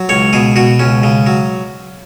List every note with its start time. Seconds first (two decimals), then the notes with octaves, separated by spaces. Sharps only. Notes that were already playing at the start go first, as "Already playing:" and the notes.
Already playing: F#3
0.09 C#2 C#5
0.33 B2 G#4
0.56 B2 F#4
0.79 C#2 C#4
1.03 C#3
1.27 F#3